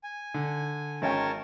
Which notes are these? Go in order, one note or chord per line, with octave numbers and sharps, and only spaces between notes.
G#5
D3
G#1 C#4 A#4 C#5 G5 A5